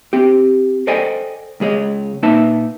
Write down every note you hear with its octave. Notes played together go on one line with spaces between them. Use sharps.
C4 G4
A4 C5 D5 D#5 G5 G#5
C#2 G#3 G#4 C#5 D#5
A#2 A#3 D#4 B4 E5 A5